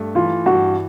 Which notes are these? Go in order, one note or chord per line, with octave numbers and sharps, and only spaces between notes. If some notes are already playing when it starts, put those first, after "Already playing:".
Already playing: G2 A3
E3 F4
G2 F#4